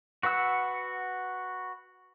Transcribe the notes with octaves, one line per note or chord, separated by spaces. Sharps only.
F#4 B4 F#5 E6